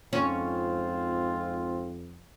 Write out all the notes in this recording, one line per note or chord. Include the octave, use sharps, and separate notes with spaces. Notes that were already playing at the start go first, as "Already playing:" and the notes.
F2 G#2 C4 C#4 F4